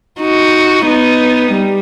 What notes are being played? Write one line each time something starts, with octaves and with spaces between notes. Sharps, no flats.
D#4 F#4
B3 D#4
G3